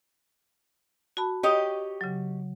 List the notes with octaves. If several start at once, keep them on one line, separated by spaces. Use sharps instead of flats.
F#4 A5 B5
G4 C#5 D#5
C#3 F#3